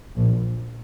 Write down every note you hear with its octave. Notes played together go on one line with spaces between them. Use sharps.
A#1